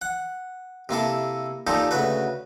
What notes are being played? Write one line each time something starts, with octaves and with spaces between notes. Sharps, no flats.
F#5
C3 A#3 E4 A4
A#2 F3 D#4 G4 A4
D2 C#3 F#4 B4